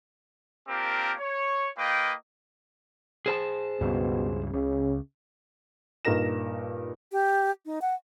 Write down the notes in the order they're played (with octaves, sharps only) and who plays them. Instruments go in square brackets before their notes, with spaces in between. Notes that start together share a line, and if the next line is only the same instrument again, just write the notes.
[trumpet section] A#3 C4 D4 F4 G4 A#4
C#5
A#3 F4 B4 D#5 G5
[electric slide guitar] G#4 C5 A5
[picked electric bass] C#2 G2 [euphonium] B2
[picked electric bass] C#2 [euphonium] C#3
[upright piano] G2 A#2 D#4 A#4 A#6 E7
[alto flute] G4
D#4
F#5